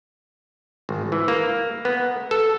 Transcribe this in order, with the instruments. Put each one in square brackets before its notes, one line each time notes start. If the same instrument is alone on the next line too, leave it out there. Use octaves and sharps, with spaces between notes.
[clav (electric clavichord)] G#1
E3
A#3
B3
A4